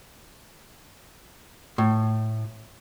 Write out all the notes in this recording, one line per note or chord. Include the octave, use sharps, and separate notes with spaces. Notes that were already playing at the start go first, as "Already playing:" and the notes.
A2